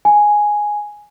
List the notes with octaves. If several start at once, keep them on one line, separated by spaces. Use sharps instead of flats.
G#5